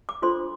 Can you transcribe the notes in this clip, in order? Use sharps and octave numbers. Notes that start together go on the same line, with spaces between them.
D6
D4 F4 A4 C5 C6